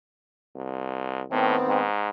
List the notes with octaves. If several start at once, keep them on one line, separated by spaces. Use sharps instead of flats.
C2
A2 D#3 B3 C4
G#2